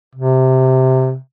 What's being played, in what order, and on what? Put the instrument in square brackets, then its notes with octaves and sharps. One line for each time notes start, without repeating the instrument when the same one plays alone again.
[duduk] C3